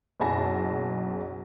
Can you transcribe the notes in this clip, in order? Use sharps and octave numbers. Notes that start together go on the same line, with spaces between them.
F#1 B1 G#4 A5 A#6